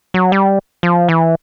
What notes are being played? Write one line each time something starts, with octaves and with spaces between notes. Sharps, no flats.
F#3
G3
F3
E3